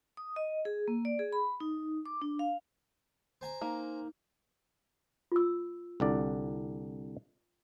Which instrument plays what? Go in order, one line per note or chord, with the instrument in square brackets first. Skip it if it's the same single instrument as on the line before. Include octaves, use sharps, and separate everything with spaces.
[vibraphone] D#6
D#5
G#4
A#3
D5
G#4
B5
D#4
D6
D4
F5
[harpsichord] C5 G#5 A#5
[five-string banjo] A#3 [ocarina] D#4
[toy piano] F4 E6
[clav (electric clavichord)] C2 D3 D5